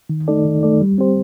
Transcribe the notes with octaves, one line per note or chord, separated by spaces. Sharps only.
D#3
A3 D#4 A4 D5
D#3
A3 D#4 A4 D5
G3
C4 G4 C5